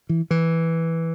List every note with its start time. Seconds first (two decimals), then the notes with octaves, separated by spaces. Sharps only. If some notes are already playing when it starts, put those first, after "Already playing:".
0.09 E3
0.31 E3